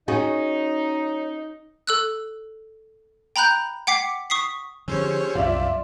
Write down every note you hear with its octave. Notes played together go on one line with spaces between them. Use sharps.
C#4 D#4 F#4 G#4
A4 E6 F#6
G5 A#5 B5 F#6 G6
F#5 G5 D6 B6 C7
C#6 D#6 B6 C7
D3 F3 C#4 G4 G#4 C5 C#5 E6
C2 F#2 F4 D5 E5 C6